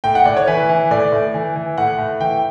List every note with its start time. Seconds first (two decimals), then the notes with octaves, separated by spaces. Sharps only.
0.04 A2 G5
0.15 F#5
0.25 A2 D5
0.37 C#5
0.47 E3 B4
0.69 E3
0.91 A2 D5
1.12 A2
1.34 E3
1.56 E3
1.78 A2 F#5
1.98 A2
2.20 E3 G5